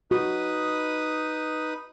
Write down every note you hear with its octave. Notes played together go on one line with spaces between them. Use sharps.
D#4 F#4 B4 D#6